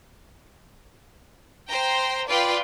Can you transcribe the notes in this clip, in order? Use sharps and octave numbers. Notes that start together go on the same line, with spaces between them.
C5 G5 A#5
F4 B4 D5 G5